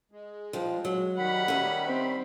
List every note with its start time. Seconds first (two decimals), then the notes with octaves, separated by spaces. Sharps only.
0.11 G#3
0.53 F3 G3
0.85 F#3
1.17 D#3 G3 F#5 B5
1.48 C#4 E5
1.87 C4